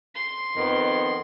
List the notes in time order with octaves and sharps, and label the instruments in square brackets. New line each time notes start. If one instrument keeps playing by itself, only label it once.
[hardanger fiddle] C6
[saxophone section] F2 D#3 B3